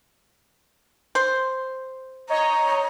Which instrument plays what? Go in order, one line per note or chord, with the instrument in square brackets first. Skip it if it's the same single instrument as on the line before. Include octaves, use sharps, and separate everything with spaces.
[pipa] C5
[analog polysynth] C#5 D#5 [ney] A#5